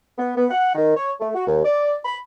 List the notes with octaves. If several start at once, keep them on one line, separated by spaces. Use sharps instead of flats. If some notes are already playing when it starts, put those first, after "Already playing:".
B3
B3
F#5
D#3
C#5
A3
F#4
D#2
D5
B5